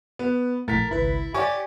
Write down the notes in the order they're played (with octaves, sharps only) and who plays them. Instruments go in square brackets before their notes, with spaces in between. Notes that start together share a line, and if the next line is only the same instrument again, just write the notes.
[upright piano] B3
[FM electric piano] A#1 A2 [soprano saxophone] A#4 [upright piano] A6 B6
[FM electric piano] G#1 C#2 B4 [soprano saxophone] E4
[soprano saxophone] G4 [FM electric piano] C#5 G#5 [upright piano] D5 C#6